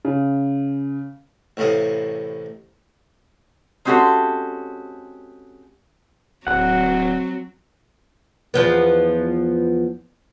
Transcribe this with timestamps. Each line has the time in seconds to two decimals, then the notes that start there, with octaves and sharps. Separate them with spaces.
0.05 C#3
1.57 A1 A2 C3 F5 D#6
3.85 G#3 C4 C#4 F#4 G4 A4
6.47 D1 F#3 C4 F#5
8.54 E2 F3 B3